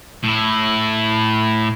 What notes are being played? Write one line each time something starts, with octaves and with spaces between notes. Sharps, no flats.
A2 E4